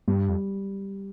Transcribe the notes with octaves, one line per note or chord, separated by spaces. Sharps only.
G2 G3
F2